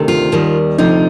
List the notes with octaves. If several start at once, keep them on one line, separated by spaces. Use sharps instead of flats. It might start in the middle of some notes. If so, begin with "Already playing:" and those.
Already playing: D2 C3 D#3
F4
D#2 D#3 G3
D2 C3 F3 D#4